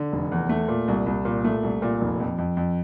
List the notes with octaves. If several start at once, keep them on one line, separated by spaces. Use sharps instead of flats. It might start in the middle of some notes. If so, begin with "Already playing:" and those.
Already playing: D3
F1
E2
A3
A#2
C2
C2
A#2
A3
C2
A#2
F1
F2
F2
F2